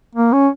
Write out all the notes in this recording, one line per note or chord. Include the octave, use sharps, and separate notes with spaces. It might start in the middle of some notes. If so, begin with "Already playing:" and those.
A#3
C#4